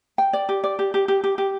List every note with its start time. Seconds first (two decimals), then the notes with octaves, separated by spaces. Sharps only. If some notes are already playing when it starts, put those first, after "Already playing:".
0.18 G5
0.33 D5
0.49 G4
0.64 D5
0.79 G4
0.94 G4
1.08 G4
1.24 G4
1.38 G4